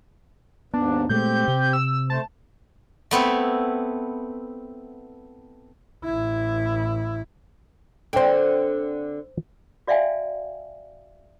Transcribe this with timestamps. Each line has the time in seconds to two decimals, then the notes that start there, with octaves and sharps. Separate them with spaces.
0.74 D#2 G#2 B3 D4
1.09 A#2 G#3 A3 C4 G4 G6
1.48 C3
1.73 E6
2.10 A3 C5 A5
3.11 A3 B3 C4 E4
6.04 A1 E4
8.13 D3 C4 C5 G5
9.87 F#4 D5 E5 F5 G5 G#5